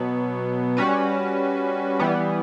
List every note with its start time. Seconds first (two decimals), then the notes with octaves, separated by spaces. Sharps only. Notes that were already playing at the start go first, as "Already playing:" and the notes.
Already playing: B2 F#3 B3
0.77 G3 C#4 F#4 B4
1.99 E3 G3 B3